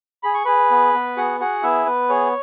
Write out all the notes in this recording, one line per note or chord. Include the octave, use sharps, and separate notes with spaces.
G#4 B5
C#6
G#4 B4 B5
B3
B3
F#4 G#4 F#5
F#4 G#4 F#5
B3 E4 E5
B3 B4
G#4 C#5